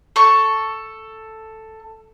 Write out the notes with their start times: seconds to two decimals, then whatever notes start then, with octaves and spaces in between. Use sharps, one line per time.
0.16 A4 C#6